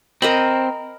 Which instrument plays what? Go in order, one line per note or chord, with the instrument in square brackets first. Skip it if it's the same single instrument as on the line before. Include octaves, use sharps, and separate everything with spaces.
[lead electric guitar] C4 [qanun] A#4 D#5 B5